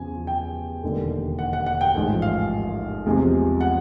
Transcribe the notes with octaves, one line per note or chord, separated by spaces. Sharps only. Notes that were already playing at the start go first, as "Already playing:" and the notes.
Already playing: E2 C#3 F3 G#5
G5
E1 D#2 D3 G3
F#5
F#5
F#5
G5
A1 G#2 F3 G#3
F5
E2 C3 F3 G#3
F#5